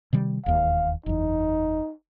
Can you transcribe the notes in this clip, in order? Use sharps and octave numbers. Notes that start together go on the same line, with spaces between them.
C3 D#3 G3
E1 D#2 F5
F#1 E2 D#4